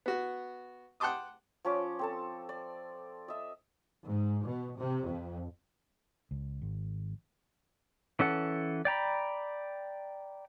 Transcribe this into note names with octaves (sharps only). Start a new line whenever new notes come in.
B3 F#4
F#5 G5 A5 C6 D6 D#6
F3 C#4 D6
C4 A4 A5
D5
D#5 E5
G#2
B2
C3
F2
C#2
G#1
E3 C#4 A4 F#5
D5 G5 A#5 B5